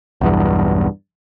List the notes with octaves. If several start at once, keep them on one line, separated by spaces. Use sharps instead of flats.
B1 E2 G2